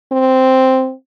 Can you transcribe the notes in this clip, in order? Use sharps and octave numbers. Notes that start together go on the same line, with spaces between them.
C4